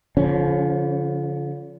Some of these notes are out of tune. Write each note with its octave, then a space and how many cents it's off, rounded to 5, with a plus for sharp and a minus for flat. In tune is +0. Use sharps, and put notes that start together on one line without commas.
D3 -45 F3 +0 C#4 +0